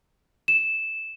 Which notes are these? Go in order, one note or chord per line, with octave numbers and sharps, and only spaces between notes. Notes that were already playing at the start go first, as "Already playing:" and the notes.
E7